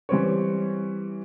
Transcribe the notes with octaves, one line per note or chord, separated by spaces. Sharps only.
E3 G3 C4 C#5